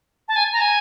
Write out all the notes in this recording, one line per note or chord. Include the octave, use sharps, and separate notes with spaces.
A5
G#5
A#5
G#5